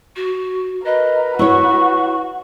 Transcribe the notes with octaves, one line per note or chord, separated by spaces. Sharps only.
F#4
A#4 B4 D#5
E4 F#4 C#5 C#6